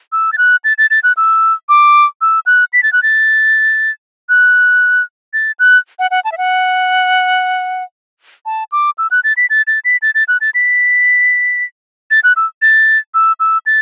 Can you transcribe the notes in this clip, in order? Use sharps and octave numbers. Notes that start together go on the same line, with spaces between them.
E6
A6
F#6
A6
A6
A6
F#6
E6
D6
E6
F#6
B6
A6
F#6
A6
F#6
A6
F#6
F#5
F#5
A5
E5
F#5
A5
D6
E6
F#6
A6
B6
A6
A6
B6
A6
A6
F#6
A6
B6
A6
F#6
E6
A6
E6
E6
A6